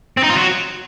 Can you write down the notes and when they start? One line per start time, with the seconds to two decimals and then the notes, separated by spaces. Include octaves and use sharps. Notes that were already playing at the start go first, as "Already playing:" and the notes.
0.17 C4
0.23 D#4
0.30 F4
0.36 F#3